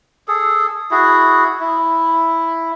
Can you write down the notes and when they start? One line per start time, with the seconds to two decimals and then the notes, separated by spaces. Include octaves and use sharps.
0.28 G#4 A4
0.91 E4 F#4 G#4
1.60 E4